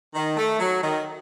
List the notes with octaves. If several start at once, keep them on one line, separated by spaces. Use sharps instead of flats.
D#3
A3
F#3
D#3